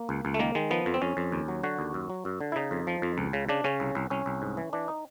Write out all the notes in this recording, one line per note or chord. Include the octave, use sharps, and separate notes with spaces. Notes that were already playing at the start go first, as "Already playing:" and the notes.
Already playing: A#3
C#2
C#2
A3
D#3 A#3
D#3 G#3
F3 B3
F2
C4
F2 C#4
F2
D#2
F#3
D3 F#4
D#2
F#2
F#3
F#2
D3
E4
C#3 D#4
F2
F3
F2
C#2
C#3
C#3 D4
C#3 C#4
C2
C2
C2 C#4
C2
G#2
E3
E3 D4
D#4